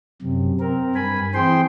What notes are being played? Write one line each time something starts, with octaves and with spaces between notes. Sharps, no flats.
F#2 C3
C4 A#4
G2 G#5 B5
E3 C4 G#4 C5 G5 C6